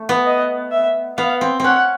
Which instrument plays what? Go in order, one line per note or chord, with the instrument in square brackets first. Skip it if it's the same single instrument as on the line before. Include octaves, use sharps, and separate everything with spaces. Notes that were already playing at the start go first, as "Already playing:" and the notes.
Already playing: [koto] A3
B3
[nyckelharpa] D#5
E5
[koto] B3 [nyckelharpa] F5
[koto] C4
[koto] C4 C#4 [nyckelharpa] F#5